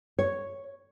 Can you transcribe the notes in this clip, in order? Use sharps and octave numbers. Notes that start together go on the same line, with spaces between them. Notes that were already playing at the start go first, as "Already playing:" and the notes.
C#5